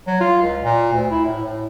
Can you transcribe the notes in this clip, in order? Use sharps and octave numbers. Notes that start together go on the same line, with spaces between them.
F#3
F4
C#2
A#2
D2
E4
A2
A2